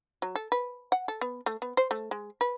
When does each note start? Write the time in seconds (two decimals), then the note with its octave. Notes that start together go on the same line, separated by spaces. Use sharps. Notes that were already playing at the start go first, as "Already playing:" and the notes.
0.22 F#3
0.36 A4
0.52 B4
0.92 F#5
1.08 A4
1.21 B3
1.46 A3
1.62 B3
1.77 C5
1.91 A3
2.11 G#3
2.41 B4